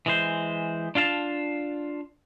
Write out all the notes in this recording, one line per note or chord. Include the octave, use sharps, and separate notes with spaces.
E3 G#3 C5
D4 F4 F5 A5